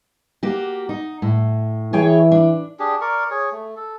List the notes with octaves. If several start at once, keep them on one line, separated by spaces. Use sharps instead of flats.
A#3 F#4 G4
D#4
A2
E3 G#4 C#5 G5
D4
D4 G4 G#4
A#4 D5 C#6
G#4 C#5
A3
A4